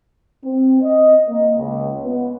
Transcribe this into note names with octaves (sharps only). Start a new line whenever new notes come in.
C4
D#5
A#3
C#2
B3